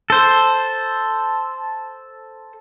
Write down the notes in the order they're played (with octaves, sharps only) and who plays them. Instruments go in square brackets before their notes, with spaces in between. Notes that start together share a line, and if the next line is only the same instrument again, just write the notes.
[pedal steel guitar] A4 C5